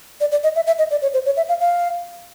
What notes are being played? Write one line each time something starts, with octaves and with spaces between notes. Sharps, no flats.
D5
D5
D#5
E5
E5
D#5
D5
C#5
C5
C#5
E5
F5
F5